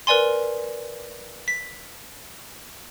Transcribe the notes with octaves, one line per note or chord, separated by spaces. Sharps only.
A#4 B4 D5 G#5 C6
B6